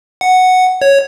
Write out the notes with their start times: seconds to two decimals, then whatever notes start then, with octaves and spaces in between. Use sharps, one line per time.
0.21 F#5
0.82 C#5